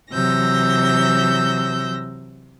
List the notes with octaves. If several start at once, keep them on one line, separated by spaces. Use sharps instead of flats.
C3 E3 F#3 E6 G6 A#6